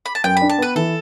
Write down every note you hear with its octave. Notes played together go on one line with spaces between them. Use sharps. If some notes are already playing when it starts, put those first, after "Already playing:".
B5
A5
F#2 G5
D4 B5
A5
B3 B4
E3 A4